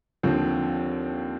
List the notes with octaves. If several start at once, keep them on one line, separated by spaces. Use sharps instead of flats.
D#2 D3 F3 C4